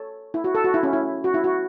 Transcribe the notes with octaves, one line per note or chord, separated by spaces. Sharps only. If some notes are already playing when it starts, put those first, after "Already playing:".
Already playing: A4 C#5
E4
F#4
A4
F#4
E4
C#4
E4
F#4
E4
F#4